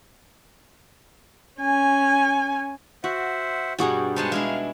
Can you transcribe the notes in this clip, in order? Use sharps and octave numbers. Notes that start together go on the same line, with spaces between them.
C#4 G#5
F#4 C5 E5 F#5
G2 B2 G3 F#4 G#4
G#3 B3 D#4 C5 F#5 A5
G#3 D4 E4 F5